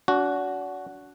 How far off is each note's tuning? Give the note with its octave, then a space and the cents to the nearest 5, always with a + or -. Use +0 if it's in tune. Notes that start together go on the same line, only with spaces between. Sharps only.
D4 -40 F#4 +0